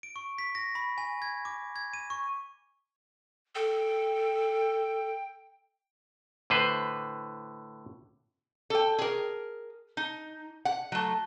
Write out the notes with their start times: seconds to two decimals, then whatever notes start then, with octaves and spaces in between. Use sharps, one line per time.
0.03 D7
0.16 C#6
0.38 B6
0.55 A#6
0.75 B5
0.98 G#5
1.22 G#6
1.45 D6
1.76 G#6
1.94 D#7
2.10 C#6
3.55 A4 G5
6.50 A2 D3 B4 C5
8.70 A4 G5
8.98 G#4 A#4
9.97 D#4
10.65 F#5
10.92 F#3 A3